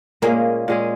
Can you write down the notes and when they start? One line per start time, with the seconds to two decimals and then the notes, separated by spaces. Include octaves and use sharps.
0.22 A#2 G#3 A#3 C#4 G#4
0.68 A#2 G#3 C#4 G#4